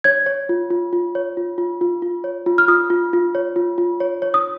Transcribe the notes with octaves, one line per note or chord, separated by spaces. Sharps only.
C#5 G#6
C#5
F4
F4
F4
C#5
F4
F4
F4
F4
C#5
F4
F6
F4 D#6
F4
F4
C#5
F4
F4
C#5
C#5
D#6